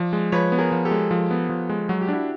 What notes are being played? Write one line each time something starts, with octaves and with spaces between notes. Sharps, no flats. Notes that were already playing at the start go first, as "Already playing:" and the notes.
Already playing: F3 D5
G#3
F3 B4 C#5
B3
G#4 A#4
F3
G4 A4
G#3
F3
B3
F3
G#3
F#3 F#4
G4
D4 E4 F#4